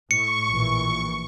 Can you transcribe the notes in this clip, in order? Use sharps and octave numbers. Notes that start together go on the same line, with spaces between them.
A2 C#6 C#7
A#1 A#2 E3